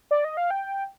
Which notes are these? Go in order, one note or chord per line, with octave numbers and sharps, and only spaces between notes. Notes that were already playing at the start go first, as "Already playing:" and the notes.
D5
D#5
F5
G5